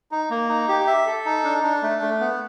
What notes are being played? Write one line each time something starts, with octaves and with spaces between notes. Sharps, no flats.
D#4
A#3
D#4
G4
E5
A4
D#4
D4
D4
A3
A3
B3